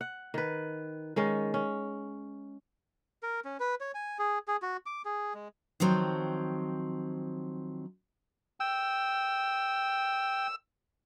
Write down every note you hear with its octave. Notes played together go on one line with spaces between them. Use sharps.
F#5
D#3 B4
D#3 G#3 C#4
C#4
A#4
C#4
B4
C#5
G#5
G#4
G#4
F#4
D6
G#4
G#3
D#3 F3 F#3 C4
G5 E6